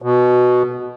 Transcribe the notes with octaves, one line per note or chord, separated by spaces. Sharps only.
B2